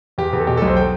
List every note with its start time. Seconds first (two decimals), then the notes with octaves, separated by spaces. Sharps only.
0.18 E2 G4
0.33 E2
0.40 A4
0.47 B2 G4
0.57 A4
0.62 B1
0.67 C5
0.76 G5